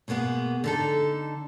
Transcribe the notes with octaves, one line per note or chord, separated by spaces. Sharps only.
B2 G#3 A#3 B3 G#4
D3 D#4 A4